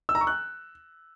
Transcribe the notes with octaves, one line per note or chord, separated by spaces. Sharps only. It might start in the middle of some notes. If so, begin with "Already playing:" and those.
E6
A#5
C#6
F#6